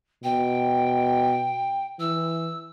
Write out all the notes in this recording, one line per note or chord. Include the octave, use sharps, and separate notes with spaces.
B2 G5
E3 E6